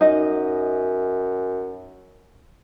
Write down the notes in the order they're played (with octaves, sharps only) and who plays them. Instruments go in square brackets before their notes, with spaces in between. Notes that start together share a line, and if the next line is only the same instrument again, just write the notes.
[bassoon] F#2 [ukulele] D#4 D#5